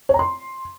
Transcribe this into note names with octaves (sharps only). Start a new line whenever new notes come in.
C#5
A#5
C6